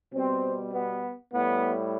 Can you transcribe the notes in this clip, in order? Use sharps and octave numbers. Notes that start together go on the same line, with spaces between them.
B2 G3 C4
B3
A2 G3 B3